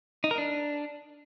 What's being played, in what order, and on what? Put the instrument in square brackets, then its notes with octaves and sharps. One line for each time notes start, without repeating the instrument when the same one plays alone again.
[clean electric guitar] D#4
A#4
D4